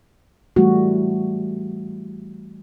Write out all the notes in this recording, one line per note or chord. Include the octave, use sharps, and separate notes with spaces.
E3 G3 A3 F#4